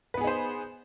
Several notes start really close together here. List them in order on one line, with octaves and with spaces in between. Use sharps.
B4 B3 G#4 D#4 C5